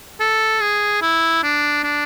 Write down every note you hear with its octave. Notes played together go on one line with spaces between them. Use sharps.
A4
G#4
E4
D4
D4